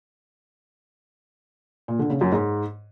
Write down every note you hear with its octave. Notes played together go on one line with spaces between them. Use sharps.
A#2
D3
C#3
F#2
G#2